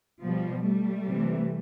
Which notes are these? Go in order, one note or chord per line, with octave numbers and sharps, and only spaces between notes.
B2 F3 G3
G3 A3
C3 E3